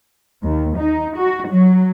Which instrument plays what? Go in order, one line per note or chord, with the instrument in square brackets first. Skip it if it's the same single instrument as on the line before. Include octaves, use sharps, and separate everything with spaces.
[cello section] D#2
D#4
F#4
F#3